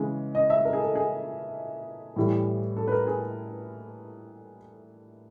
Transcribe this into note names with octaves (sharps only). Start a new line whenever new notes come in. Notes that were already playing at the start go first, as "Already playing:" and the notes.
Already playing: C#3 E3 G#3
D#5
E5
A#4
G#4
A4
G#4
A2 E3 G3
A4
B4
A#4
G#4